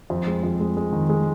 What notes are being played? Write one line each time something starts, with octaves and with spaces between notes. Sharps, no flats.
F2
G#3
F2
G#3
G#3
D#3
G#3